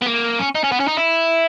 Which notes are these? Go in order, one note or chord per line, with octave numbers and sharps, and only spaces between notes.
B3
A#3
C#4
D#4
C#4
B3
C#4
D#4
E4